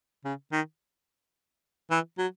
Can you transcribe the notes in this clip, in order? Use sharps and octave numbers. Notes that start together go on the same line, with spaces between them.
C#3
D#3
E3
F#3